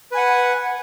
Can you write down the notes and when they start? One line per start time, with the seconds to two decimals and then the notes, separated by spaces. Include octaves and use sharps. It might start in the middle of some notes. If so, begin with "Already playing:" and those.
0.12 B4
0.15 G#5
0.17 F#5